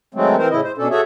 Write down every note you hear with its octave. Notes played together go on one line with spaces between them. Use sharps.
D#3 F#3 G#3 A3 C4
E3 C4 A#4 C5
A2 C#3 E4 D#5
C5
B2 C#4 D4 A4
F#4 G#4 A4 C#5 E5